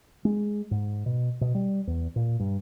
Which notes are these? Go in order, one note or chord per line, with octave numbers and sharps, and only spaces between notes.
G#3
G#2
B2
B2
G3
E2
A#2
G2